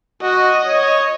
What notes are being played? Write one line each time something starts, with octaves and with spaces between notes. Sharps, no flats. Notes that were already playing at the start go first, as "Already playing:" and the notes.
F#4 D#5
C#5